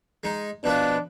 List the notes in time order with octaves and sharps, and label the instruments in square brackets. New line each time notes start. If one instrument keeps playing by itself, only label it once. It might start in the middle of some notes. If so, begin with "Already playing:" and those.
[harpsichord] G#3 D#4
[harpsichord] B2 F3 B4 [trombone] D4